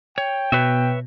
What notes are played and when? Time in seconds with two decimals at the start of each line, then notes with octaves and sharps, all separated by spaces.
0.18 C#5 G5
0.52 B2 B4 C#5 E5